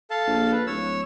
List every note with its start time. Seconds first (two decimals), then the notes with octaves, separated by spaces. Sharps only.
0.10 A4 F5 A5
0.27 A#1
0.52 B4
0.67 D1 C#5 E6